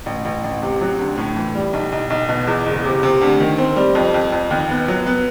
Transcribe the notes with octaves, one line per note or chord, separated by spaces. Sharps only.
A1
A1
A1
C3
F#3
D2
A2
E3
G3
B1
B1
B1
B2
E2
F#1
C3
C3
D2
D#3
C4
G3
F2
F2
F2
D#2
B3
F#3
B3